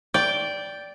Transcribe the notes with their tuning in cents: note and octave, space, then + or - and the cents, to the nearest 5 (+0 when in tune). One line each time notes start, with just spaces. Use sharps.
D5 -10 G5 +0